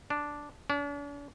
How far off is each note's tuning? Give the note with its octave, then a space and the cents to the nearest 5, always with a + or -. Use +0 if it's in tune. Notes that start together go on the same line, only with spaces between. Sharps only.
D4 -5
D4 -45